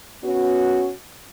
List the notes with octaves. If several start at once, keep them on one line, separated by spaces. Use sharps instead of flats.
B3 C#4 F#4